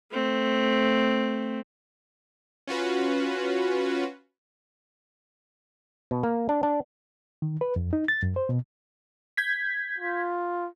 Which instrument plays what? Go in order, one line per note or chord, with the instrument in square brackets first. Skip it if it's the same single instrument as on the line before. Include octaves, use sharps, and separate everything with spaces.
[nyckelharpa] A3 C4
[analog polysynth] C#4 F4 F#4 B4
[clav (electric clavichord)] B2
A#3
D4
D4
[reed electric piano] D#3
B4
F2
D#4
A6
F#2
C5
B2
[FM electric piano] G6 G#6 B6
[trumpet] F4